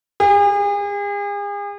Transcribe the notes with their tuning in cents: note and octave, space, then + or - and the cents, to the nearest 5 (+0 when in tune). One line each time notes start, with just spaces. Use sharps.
G#4 -40